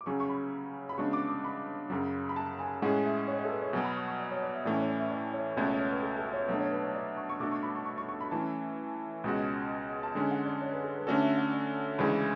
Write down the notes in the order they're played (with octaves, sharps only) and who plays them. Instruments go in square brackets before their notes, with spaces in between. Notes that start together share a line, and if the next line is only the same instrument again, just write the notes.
[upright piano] D6
[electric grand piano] C#3 F#3 C#4 G#4 [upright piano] C#6
[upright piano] C#6
B5
B5
[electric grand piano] C#3 G#3 B3 D4 F#4 [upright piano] C#6
[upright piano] D6
D6
B5
[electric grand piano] F#2 C#3 F#3
[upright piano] B5
A5
G#5
[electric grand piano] A2 G#3 C#4 G#4 [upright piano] F#5
[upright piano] E5
C#5
C#5
A4
B4
C#5
[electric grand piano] B2 F#3 B3 [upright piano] G#5
[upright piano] B5
C#6
C#6
D5
C#5
D5
E5
[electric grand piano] A2 E3 A3 C#4 [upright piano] D5
[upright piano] C#5
D5
E5
D5
C#5
[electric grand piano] C#2 B2 A3 C#4 [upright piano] D5
[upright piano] C#5
C#5
B4
A4
A4
C#5
[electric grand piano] B2 F#3 A3 D4 A4 [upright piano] E5
[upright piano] C#5
B4
C#5
D5
C#6
C#6
[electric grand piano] B2 A3 D4 F#4 A4 [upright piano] D6
[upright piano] C#6
B5
C#6
C#6
C#6
C#6
B5
[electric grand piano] E3 A3 C#4 [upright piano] A5
[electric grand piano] C#2 B2 G#3 C#4 F#4
[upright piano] A5
[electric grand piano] D3 G#3 C#4 [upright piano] G#5
[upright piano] F#5
D5
C#5
B4
A4
B4
[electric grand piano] D3 A3 C#4 F#4 A4 [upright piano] D5
[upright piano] E5
F#5
D5
[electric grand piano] D2 C#3 E3 G#3 [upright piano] B5